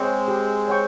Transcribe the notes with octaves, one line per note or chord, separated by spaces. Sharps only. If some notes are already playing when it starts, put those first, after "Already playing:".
Already playing: G#3 C4 C#5 G5 C#6
G4
C#5 G5 C#6